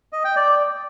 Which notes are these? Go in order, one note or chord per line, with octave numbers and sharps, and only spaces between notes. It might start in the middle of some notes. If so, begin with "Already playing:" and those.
D#5
G5
D5